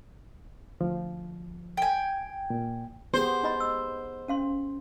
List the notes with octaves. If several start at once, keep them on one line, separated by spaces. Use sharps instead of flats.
D2 F3
G5 G#5
A#2
B3 G4 G#4 C5
D#4 D#5 B5
E6
C#4 F5 C6